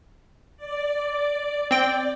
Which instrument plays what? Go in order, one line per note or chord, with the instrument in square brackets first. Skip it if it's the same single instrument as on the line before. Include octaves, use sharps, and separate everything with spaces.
[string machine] D5
[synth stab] C4 G5 [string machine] D5